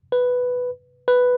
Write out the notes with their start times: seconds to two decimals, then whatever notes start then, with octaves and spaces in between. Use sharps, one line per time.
0.12 B4
1.08 B4